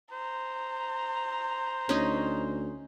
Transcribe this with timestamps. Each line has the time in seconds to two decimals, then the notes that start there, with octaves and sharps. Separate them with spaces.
0.12 C5 A#5
1.89 D2 C#4 D#4